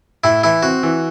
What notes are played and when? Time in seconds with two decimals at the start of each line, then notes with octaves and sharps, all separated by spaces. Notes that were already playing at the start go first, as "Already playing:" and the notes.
0.24 A2 E4
0.44 E3 E4
0.63 C4 F#4
0.83 E3